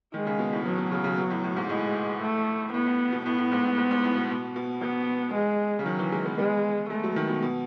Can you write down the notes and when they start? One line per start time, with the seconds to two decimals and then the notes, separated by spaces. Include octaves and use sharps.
0.14 D#3 G#3
0.26 C#3
0.39 B2
0.52 A2
0.65 B2 F#3
0.78 B2
0.92 C#3
1.04 C#3
1.17 B2
1.30 A2
1.44 A2
1.56 G#2
1.69 A2 G#3
2.22 A3
2.73 A2 B3
2.86 A2
3.12 B2
3.26 A2 B3
3.38 A2
3.52 G#2
3.65 A2
3.78 G#2
3.91 G#2
4.04 A2
4.17 B2
4.30 B2
4.56 B2
4.82 B3
5.34 G#3
5.79 C#3
5.86 D#3 F#3
5.99 E3
6.12 G#3
6.25 B3
6.38 G#3 B3
6.90 G#3 A3
7.04 F#3
7.16 D#3
7.29 B2
7.42 B2